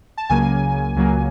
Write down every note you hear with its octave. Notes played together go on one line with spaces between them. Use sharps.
A5
C#2 C#3 F#3 A#3 G#5
C#2 C#3 F#3 A#3